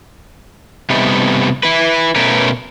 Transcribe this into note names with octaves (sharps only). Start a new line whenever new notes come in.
C3 G3 A3 B3 D#4
E4 B4
B2 A3 C#4 A#4 B4